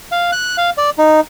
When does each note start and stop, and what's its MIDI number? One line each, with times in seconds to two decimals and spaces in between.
0.12 0.31 77
0.32 0.57 90
0.58 0.70 77
0.78 0.90 74
0.98 1.20 63